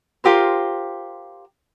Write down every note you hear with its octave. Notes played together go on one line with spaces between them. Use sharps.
F4 G4 A#4 C5